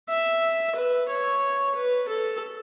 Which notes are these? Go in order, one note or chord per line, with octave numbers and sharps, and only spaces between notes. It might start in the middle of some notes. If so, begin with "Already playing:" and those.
E5
B4
C#5
B4
A4